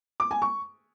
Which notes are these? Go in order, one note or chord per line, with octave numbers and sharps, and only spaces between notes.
D6
G#5
C#6